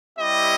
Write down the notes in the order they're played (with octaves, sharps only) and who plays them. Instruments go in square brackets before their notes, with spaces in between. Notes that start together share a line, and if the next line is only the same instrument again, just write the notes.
[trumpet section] G3 C4 E4 G4 D#5